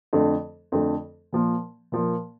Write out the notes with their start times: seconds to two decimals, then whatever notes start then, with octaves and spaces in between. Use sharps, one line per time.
0.13 F2 D3 A3
0.72 F2 D3 A3
1.32 A#2 F3 A#3
1.92 A#2 F3 A#3